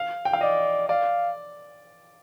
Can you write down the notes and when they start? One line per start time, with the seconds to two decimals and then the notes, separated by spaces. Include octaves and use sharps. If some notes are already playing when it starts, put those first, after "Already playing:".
Already playing: F5
0.25 G5
0.33 F5
0.41 D5 D#5
0.89 D5 F5